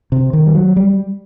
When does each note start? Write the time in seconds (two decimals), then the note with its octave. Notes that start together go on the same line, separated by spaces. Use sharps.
0.12 C3
0.33 D#3
0.46 G3
0.55 F#3
0.76 G3